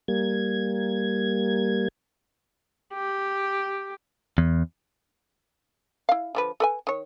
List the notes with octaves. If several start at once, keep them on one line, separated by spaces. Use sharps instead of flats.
G3 A#3 G#6
G4
E2
E4 F5
D3 F3 B4
A4 B4 G#5
D#3 C#5